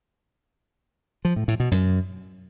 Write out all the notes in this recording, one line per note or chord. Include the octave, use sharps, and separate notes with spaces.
F3
A2
A2
B2
F#2